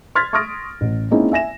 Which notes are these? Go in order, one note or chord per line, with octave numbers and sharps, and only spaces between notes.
C6 F6 G#6 A6 B6
C6 C#6 D#6 F6 A#6 D7
A1
G#3 A#3 C4 C#4 D#4 E4
E5 G#5 A#6 E7